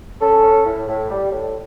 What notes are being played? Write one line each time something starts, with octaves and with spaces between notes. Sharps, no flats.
C#4 A4
C#4
A2
A2
G3
A2